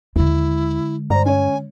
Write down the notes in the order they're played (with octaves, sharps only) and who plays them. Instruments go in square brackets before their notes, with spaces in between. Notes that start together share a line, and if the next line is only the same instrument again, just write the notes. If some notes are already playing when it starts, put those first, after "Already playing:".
[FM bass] D#2 [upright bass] D3 G#3 [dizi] E4
[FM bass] G2 [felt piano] C5 D5 [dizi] A#5
[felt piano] C#4 C#5 [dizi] G#5